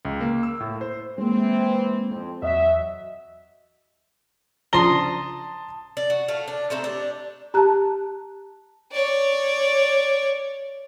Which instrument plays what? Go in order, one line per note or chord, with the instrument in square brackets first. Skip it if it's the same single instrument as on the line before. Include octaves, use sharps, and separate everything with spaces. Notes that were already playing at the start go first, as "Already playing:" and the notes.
[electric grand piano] C#2
A#3
E6
A2
C5
[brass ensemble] E3 C4 [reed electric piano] G#3 A#3
[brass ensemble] F2 C4
[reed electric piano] E2 D#5 [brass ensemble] F#3 F#4 E5
[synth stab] C#3 F3 D4 [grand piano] A5 G7 [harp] A#5 C6 D#6
[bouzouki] D5
F#4
A3 F5
D4
A3 C4 D#4 A4
D4 G4
[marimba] G4 F#6 [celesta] A5 A#5
[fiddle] C#5 D5